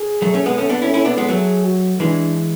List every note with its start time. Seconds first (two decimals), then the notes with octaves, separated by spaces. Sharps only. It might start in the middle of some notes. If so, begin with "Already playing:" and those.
Already playing: G#4
0.22 F#3 A3
0.34 A3 C#4
0.46 G#3 B3
0.57 A3 C#4 A4
0.70 B3 D4
0.82 C#4 E4
0.93 C#4 E4 A4
1.05 B3 D4
1.17 G#3 B3
1.29 F#3 A3 G#4
1.65 F#4
2.00 E3 G#3 D4